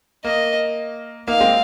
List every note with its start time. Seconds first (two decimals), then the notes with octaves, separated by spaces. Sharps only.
0.25 A#3 D#5
1.27 A#3 D#4 F5
1.41 G#3 C4